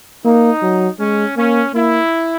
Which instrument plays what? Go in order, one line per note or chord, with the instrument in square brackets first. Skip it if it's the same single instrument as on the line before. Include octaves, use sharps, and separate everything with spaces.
[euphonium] A#3 [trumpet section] D#4
[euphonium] F#3
[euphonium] G#3 [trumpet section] C#4
[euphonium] A#3 [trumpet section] C#4
[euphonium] A#3 [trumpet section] E4